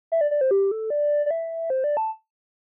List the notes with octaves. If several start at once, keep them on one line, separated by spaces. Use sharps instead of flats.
E5
D5
D5
C5
G4
A4
D5
D5
E5
C5
D5
A5